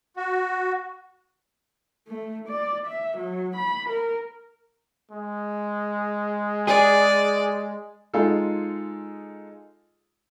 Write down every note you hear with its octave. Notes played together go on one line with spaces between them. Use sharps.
F#4
A3
D5
E5
F#3
B5
A#4
G#3
G#4 D5
G#3 D#4 F4 G#4 A4